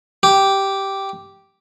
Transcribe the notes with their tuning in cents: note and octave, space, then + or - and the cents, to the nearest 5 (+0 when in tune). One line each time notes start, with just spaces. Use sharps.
G4 -5